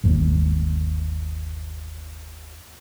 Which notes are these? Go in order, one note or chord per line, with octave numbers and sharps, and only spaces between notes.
G1 D#2